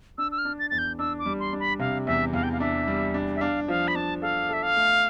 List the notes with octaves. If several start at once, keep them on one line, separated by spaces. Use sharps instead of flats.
D4 E6
E6
F6
D4
A6
E2 A6
G6
D4 E6
D6
G3
C6
D4
B5
C3 F5
E2 E5
E2 F5
G5
F5
D4 E5
G3
D4
E5
D4 F5
F3 F5
B5
D4 A5
A4 F5
A4 E5
F5
A3